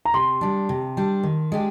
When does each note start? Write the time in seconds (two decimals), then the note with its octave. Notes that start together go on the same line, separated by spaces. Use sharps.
0.05 A#5
0.14 C3 C6
0.41 G3 D4
0.69 C3
0.97 G3 D4
1.23 D#3
1.52 G#3 D4 G4